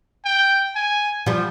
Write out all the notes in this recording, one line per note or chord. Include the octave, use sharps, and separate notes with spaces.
G5
G#5
F3 G3